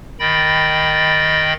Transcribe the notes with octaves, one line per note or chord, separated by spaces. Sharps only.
D#3 D#5 G5 B5 A6